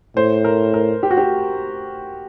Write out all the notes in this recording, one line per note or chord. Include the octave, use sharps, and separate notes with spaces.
A2 C5
A#4
A#4
G4
F#4
G4